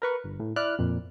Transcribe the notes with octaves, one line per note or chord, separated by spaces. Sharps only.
A#4 B4 C#6
G1
A2
E4 D5 F6 F#6
F2 A#2